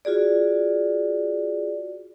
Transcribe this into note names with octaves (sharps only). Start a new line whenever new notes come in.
F4 F#4 G#4 D5